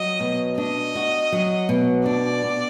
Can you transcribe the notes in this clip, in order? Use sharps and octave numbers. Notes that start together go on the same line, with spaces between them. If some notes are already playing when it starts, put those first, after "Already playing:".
Already playing: F#3 D#5
B2
D4 D#5
F#4
F#3
B2
D4 D5
F#4